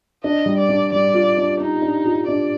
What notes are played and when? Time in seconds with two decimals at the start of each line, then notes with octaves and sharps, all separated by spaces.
0.24 D4 D#5
0.46 G3
0.58 D5
0.69 D4
0.92 G3 D5
1.14 F4
1.38 D4
1.60 D4 D#4
1.82 D4
2.05 F4
2.28 D4 D5